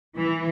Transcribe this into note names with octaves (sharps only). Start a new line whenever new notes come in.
E3